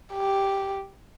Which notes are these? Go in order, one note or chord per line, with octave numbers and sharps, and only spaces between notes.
G4